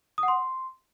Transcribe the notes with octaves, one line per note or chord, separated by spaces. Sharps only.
D#6
F#5
C6